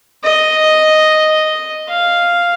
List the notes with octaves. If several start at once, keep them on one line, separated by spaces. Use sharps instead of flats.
D#5
F5